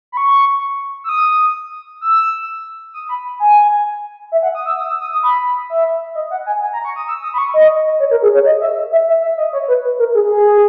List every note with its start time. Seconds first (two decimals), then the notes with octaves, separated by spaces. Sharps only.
0.12 B5
0.17 C#6
1.04 E6
1.09 D#6
2.01 E6
2.94 D#6
3.09 B5
3.40 G#5
4.32 E5
4.43 F#5
4.55 D#6
4.66 E6
4.78 D#6
4.89 E6
5.01 D#6
5.12 D#6
5.23 B5
5.70 E5
6.15 D#5
6.31 F#5
6.46 G#5
6.61 G#5
6.73 A#5
6.85 C#6
6.96 D#6
7.08 E6
7.23 D#6
7.34 B5
7.38 C#6
7.54 D#5
7.99 C#5
8.11 A#4
8.23 G#4
8.34 C#5
8.46 D#5
8.61 E5
8.91 E5
9.07 E5
9.22 E5
9.38 D#5
9.53 C#5
9.68 B4
9.99 A#4
10.14 G#4
10.30 G#4